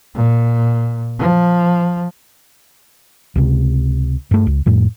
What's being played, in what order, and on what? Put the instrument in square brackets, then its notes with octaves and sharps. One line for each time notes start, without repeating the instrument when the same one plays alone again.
[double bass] A#2
F3
[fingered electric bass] C#2 C3
G2 A3
C#2
F2 A2